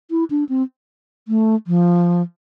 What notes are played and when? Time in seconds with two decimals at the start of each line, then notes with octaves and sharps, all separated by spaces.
0.11 E4
0.30 D4
0.49 C4
1.28 A3
1.67 F3